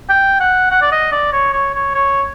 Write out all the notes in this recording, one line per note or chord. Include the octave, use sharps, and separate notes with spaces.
G5
F#5
F#5
D5
D#5
D5
C#5
C#5
C#5
C#5